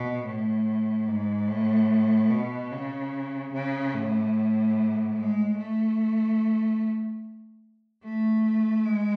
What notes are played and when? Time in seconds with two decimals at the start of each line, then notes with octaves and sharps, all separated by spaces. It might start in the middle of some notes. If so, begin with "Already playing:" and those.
Already playing: B2
0.25 A2
1.07 G#2
1.48 A2
2.30 B2
2.71 C#3
3.53 C#3
3.94 A2
5.17 G#3
5.58 A3
8.04 A3
8.86 G#3